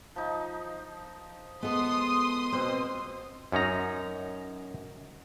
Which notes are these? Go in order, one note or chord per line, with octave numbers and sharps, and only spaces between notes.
F3 D#4
G#3 B3 A4 C6 D#6
B2 C4 C5
F#2 C#4 D#4 A#5